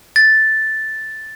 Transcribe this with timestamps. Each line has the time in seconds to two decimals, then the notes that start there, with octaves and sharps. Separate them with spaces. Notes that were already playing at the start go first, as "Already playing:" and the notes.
0.16 A6